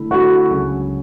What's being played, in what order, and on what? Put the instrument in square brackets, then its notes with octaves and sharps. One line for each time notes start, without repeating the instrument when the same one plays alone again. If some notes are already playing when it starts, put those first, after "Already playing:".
Already playing: [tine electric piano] D3 A3 E4
[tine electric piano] D3 A3 E4 [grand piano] F#4
[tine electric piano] C#2 C#3 F#3 C#4